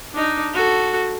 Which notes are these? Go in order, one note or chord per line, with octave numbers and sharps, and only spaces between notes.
D4 D#4
F#4 A4